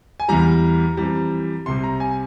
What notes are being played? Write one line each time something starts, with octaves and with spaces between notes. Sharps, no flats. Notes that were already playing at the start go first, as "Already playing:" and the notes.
G#5
E2 E3 G3 A#5
F2 E3 G3
C2 C3 G3 C6
A#5
G#5